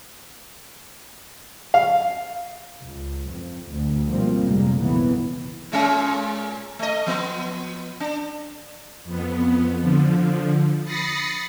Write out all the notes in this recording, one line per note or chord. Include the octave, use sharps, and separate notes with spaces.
F5
C#2
F2
D2
B2 F3 G3 A#3 C4
F1 A#2 G3 G#3 A#3
B1 F2 C#3 E3 B3
A#2 G#3 C#4
A3 D#5
F3 B3
D4
F2 B3
D3 F3
B5 D#6 A6 A#6 C7 C#7